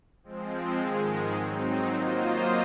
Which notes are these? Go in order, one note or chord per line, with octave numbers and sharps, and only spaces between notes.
F3 G#3 C4
G#2 D#3 G#3
F#3 C4 D#4
F#3 A#3 F4 C5 D#5